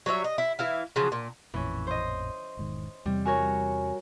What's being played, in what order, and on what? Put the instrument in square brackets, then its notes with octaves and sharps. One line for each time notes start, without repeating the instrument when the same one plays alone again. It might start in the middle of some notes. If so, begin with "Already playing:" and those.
[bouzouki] F#3 G3 C#5 E5
D#5
E4
E3 E4 F5
C#3 F3 F#3
A#2
[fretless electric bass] A1 F2 A#2 [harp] E3 C#4
[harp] C5 D#5
[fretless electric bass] E1 G#2 D#3
[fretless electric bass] E2 C3 [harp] G3
[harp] F#4 A#4 C#5 [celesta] G#5